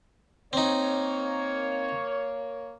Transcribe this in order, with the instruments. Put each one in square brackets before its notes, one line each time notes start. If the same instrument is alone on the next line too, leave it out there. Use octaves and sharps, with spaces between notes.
[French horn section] A#3 C#5 [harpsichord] C4 D#4